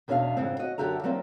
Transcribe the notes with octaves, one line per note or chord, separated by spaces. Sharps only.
E2 B2 C#4 D4 E5 F5
F2 G#2 C#3 E3 C4
F#4 D#5
F#2 D3 F#4 G4 E5 A#5
F#3 G3 A#3 C4 E4